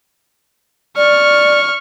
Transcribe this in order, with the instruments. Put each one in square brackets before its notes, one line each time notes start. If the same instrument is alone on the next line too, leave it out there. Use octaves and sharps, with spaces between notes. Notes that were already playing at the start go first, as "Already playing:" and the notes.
[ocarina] D5 [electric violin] C#6 F6